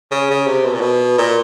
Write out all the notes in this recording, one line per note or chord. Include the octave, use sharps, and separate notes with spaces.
C#3
C#3
C3
B2
A#2
B2
A#2